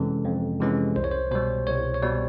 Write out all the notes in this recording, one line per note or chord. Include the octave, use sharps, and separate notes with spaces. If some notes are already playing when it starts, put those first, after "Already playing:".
Already playing: F2 C3 E3 G#3 C#4 A4
F2
C3 E3 G#3 C#4
C2 C5
C#5
C5
B2 G3 C5
C2 C#5
C#5
B2 G3 D5